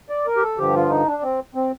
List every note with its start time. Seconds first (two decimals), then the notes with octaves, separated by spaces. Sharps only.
0.09 D5
0.26 A#4
0.36 G4
0.42 A4
0.58 G2 D3 F3 G4
0.74 F4
0.90 D#4
1.07 D4
1.23 C4
1.55 C4